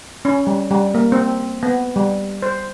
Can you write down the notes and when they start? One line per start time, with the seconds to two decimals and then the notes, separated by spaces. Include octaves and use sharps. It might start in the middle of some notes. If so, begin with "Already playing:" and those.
0.25 C#4
0.47 G3
0.71 G3
0.94 A#3
1.12 C4
1.63 B3
1.96 G3
2.42 C5